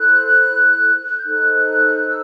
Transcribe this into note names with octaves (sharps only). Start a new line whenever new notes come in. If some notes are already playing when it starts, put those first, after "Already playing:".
Already playing: E4 A4 C5 F#6
G6
D#4 A4 C5 F#6
E6